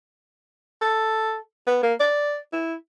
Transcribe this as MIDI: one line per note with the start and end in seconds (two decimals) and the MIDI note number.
0.81 1.38 69
1.67 1.80 59
1.83 1.93 58
1.99 2.38 74
2.52 2.74 64